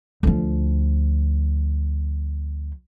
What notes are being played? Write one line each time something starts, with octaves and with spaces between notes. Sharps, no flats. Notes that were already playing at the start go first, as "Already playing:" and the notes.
D2 F3